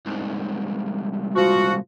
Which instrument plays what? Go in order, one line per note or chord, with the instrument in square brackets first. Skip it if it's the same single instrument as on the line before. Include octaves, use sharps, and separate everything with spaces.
[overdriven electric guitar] C2 G#2
[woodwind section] F3 F#4